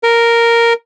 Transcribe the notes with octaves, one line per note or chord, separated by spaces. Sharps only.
A#4